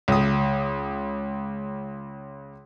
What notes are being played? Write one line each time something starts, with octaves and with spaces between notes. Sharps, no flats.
C#2 D#6